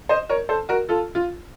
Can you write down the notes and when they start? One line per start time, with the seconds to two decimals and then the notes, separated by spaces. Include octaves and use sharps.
0.09 C5 D#5
0.29 A#4 C#5
0.49 A4 C5
0.69 F#4 A#4
0.89 F4 A4
1.15 F4